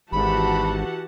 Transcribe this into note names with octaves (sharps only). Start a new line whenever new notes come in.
G#1 E3 F#4 G4 F#5 A5 B5